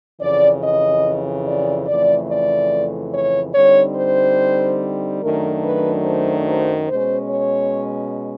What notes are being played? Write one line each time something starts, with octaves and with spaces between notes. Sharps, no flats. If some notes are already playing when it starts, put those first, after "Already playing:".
F2 C#3 E3 D5
D#5
D5
F2 C#3 E3 A3 D5
D5
C#5
D3 G3 C4 D#4 C#5
C5
F#2 D#3 F#3 A3 D4 A#4
B4
C5
C5
B2 G#3 C#4 C5
C#5